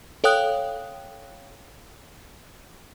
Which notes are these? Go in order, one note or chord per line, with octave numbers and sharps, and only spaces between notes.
A4 C#5 F5 G5 D#6 F#6